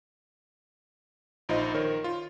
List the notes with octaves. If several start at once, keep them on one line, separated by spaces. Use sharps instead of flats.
A#1 D#4 F4 C5 D#5
D#3 A#4 C5 C#5
F4